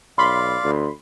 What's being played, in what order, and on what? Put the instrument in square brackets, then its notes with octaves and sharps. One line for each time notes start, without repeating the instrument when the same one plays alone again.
[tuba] B1 [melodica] D5 F5 [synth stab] B5 C6
[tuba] D2